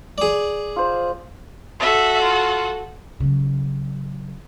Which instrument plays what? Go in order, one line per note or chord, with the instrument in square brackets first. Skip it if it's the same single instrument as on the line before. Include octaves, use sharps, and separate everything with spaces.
[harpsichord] G#4 D5
[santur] F4 C5
[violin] F#4 A4 [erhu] E5
[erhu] F4
[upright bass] C#3 F#3